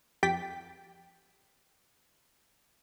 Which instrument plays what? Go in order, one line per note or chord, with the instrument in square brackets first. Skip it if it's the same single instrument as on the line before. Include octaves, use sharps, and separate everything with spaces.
[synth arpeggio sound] F2 G4 G5 A6 B6